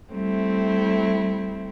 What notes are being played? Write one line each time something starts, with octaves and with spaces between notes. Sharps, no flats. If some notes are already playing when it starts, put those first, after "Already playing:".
G3 A3 C4 E4